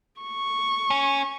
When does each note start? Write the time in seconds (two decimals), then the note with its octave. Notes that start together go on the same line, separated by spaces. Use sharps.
0.21 C#6
0.90 C#4